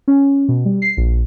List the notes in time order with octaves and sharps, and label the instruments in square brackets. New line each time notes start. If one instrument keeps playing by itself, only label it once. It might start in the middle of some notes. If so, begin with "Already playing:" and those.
[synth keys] C#4
B2
G3
C7
A#1